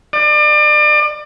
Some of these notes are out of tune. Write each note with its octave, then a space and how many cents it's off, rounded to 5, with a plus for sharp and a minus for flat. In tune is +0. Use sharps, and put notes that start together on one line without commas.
D5 +35